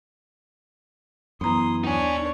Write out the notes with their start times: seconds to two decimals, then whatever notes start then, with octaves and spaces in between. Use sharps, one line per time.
1.41 F#2 E3 B3 A#5 C6 D#6
1.84 D#2 D4 D#4 C#5 G#5